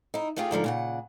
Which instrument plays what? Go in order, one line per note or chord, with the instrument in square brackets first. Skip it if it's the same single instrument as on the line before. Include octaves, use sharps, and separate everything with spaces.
[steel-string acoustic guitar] D#4 E4
A3 C#4 F4 G4 G#4
G#2 D3 F3 A#4
A#2 C#3 F#5